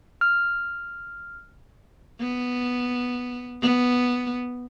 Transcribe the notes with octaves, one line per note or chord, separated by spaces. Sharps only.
F6
B3
B3